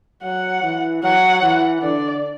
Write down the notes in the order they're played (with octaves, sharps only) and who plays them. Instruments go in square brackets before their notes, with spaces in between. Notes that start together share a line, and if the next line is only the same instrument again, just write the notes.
[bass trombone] F#3 [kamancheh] F#5
[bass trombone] E3
[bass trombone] F#3 [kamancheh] F#5
[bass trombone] E3
[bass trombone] D3 [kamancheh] D5